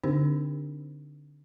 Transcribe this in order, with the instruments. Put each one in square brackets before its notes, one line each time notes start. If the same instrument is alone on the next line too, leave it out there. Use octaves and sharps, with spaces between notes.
[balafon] D3 C4 D4 D#4 G4 C5